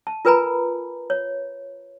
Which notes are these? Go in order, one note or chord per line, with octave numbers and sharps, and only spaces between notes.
A5
F4 A#4 B4 G#5 A#5 B5
C#5